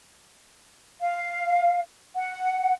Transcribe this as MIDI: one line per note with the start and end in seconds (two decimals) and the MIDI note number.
1.00 1.79 77
2.16 2.73 78